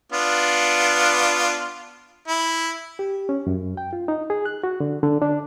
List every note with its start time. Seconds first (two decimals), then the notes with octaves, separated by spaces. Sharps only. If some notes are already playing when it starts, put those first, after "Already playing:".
0.12 B3 D4 F4
2.28 E4
2.99 G4
3.29 C#4
3.47 F#2
3.77 G5
3.93 F4
4.08 D#4
4.30 G#4
4.46 F#6
4.64 F#4
4.80 D3
5.03 D3
5.22 D4